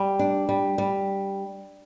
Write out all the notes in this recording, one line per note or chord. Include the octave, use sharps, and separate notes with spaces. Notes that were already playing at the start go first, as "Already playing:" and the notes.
Already playing: G3
D4
G3
G3